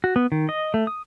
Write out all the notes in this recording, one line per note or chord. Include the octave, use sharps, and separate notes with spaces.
F#4
B3
D#3
D#5
A3
D#6